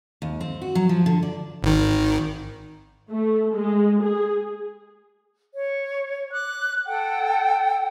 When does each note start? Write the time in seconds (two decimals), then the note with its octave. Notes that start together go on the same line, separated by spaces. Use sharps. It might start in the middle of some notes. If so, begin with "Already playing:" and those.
0.22 D#2
0.41 C4
0.62 F#4
0.75 F#3
0.89 F3
1.06 D3
1.23 D5
1.63 G#1 D#3
3.12 A3
3.55 G#3
4.04 G#4
5.54 C#5
6.32 D6 F#6
6.86 A4 F#5 G5